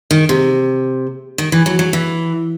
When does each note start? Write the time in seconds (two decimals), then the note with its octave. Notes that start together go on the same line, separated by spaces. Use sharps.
0.11 D#3
0.29 C3
1.38 D#3
1.52 E3
1.66 F#3
1.79 F#3
1.93 E3